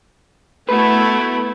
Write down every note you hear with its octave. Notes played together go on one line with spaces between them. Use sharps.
A3 B3 E4 F#4 B4